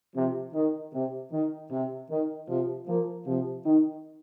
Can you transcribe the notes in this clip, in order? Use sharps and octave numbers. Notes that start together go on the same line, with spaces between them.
C3 F3
D#3
C3
D#3
C3
D#3
C3 F3
F3 A#3
C3 F3
D#3